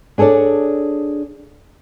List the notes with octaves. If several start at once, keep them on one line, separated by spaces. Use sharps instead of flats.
D4 G#4 A4 C#5 D5